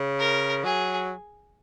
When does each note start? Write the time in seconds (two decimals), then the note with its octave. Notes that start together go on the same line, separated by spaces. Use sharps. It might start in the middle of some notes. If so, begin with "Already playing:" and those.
Already playing: C#3
0.19 A#4
0.64 F#3 G#4